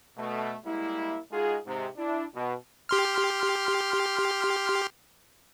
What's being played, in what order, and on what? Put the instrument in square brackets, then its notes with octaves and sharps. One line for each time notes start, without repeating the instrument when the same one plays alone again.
[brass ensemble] B2 A3
G3 G#3 A#3 E4
G#3 D#4 F4 F#4 G#4
G#2 C3
D4 E4
B2
[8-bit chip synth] G4 C6 F6